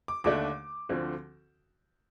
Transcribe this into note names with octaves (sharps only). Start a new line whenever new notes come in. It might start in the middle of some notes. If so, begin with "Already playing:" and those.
D6
D#2 D3 A3 D4 D6
D2 D3 F3 C4